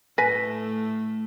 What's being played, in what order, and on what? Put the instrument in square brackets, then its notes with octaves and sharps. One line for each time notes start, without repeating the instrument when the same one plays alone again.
[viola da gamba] A2 A3 [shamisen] B4 G#5 [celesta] A#6 B6